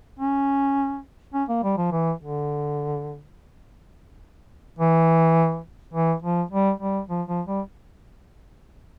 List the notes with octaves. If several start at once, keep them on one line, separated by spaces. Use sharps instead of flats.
C#4
C#4
A#3
G3
F3
E3
D3
E3
E3
F3
G3
G3
F3
F3
G3